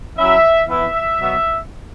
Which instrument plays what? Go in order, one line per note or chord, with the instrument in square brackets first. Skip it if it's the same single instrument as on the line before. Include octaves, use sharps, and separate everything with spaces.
[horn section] F#3 C#4 E4 E5
E3 B3 E4 E5
B2 F#3 B3